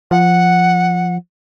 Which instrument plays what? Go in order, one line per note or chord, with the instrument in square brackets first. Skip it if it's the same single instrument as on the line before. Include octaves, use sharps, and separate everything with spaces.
[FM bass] F3 [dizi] F#5